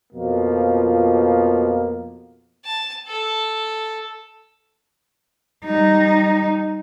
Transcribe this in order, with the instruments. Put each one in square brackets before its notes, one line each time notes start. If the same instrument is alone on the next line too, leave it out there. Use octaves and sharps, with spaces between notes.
[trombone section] F2 B2 F3 A#3
[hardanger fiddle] A5
A4
[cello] G3 D#4